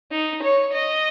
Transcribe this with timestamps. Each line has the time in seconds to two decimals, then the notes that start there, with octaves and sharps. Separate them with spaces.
0.12 D#4
0.42 C#5
0.74 D#5